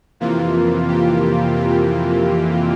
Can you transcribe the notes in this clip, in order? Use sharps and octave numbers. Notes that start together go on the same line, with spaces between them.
F2 C3 E3 A#3 F4
G4
F4